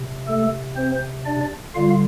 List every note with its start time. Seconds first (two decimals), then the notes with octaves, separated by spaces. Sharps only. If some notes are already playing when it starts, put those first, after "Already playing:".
Already playing: C3
0.27 A3 A4
0.76 C4 C5
1.26 D4 D5
1.75 D3 G3 F4 F5